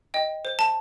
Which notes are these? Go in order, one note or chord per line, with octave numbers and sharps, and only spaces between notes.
D#5 G5
C5
A5